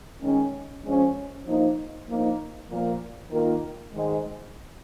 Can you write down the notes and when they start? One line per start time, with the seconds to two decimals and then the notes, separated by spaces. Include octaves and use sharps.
0.20 D#3 G#3 C#4
0.83 F3 G#3 C#4
1.45 F3 A#3 D#4
2.07 F3 A#3 D#4
2.69 A#2 F3 A#3
3.31 D#3 A#3 F4 A#4
3.93 G#2 D#3 G#3